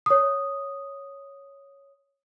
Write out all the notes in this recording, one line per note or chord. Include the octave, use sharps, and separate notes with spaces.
C#5 D#6